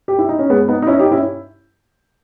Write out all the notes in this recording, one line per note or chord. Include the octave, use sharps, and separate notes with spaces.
G4
E4
D#4
C#4
G#3 B3
B3 D#4
D#4
C#4 E4
D#4 G4
C#4 E4